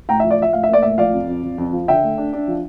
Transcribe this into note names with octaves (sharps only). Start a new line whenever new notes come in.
A2 G5 A#5
E5
F3
D5
F3 E5
A2 F5
E5
A#3 D5
A2 E5
F3 D5 F5
F2
F2
F2
F2
F3
D3 E5 G5
A3
D4
D4
F3